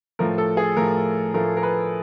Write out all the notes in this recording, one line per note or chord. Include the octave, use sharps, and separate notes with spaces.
A2 F3 A3 A#4
A4
G#4
A2 F3 A3 A#4
A2 F3 A3 A#4
A#4
B4